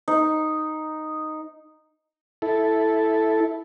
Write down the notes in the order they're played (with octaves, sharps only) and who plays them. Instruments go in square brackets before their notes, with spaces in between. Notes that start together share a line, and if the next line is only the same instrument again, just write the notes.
[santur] D#4
[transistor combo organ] E4 A4